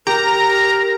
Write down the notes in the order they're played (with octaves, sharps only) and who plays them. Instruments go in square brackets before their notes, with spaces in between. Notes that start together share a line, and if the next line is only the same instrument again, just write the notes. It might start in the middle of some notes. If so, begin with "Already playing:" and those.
[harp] G4 [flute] A#4 [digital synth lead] A#5